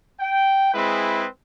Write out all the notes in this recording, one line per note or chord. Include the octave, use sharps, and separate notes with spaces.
G5
G#3 C4 E4 G#4 B4